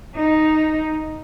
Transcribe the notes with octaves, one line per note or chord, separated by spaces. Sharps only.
D#4